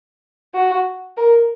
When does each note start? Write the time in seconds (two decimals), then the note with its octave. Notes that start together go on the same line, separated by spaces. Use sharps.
0.54 F#4
1.17 A#4